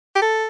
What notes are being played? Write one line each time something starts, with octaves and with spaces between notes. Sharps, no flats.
G4
A4